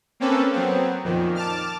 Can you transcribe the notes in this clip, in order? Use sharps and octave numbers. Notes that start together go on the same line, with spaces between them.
A#3 C4 C#4 A4 B4
F#3 B3 C4
F2 A#2 D#3
A5 D6 F6